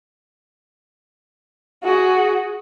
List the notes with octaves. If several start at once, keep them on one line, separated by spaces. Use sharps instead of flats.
F#4 G#4